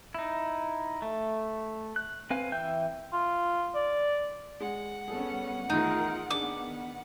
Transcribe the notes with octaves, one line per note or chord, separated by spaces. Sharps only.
D#4 E4
A3
F#6
C4 B4 F5 G#5
E3 E5 G5 G6
F4
D5
G#3 F#5
G3 B3 C#4 G#4 A4
E2 A2 D#3 D#4 F4 G#4 A#4
D#3 B3 D4 G#4 D6